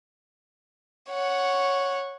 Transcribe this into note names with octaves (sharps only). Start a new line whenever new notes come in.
C#5 F#5